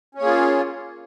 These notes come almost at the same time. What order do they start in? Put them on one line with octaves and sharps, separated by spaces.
C#4 C#5 A#3 G#4 F4